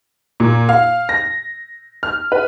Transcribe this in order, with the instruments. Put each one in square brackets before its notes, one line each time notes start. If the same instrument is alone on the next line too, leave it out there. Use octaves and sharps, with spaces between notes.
[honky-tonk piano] A#2
F5
A#6
F6
B4